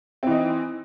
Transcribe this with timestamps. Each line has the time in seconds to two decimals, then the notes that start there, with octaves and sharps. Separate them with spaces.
0.23 C4
0.27 E3
0.31 D#4